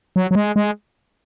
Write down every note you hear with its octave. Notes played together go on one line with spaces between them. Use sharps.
F#3
F#3
G#3
G#3